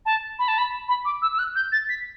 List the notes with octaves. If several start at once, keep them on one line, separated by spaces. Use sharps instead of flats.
A5
B5
A5
B5
B5
D6
E6
E6
F#6
G6
A6
B6